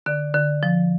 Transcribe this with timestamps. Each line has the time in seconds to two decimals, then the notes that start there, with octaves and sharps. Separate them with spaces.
0.06 D3 D5
0.34 D3
0.63 F3